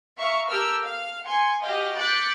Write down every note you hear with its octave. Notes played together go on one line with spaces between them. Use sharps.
E5 F5 A#5 C#6
G4 A4 A#4 E6 F6
F5
G#5 C6 C#7
F#4 G4 D#5 F5 G5
D6 F#6 G6 A6 B6 C#7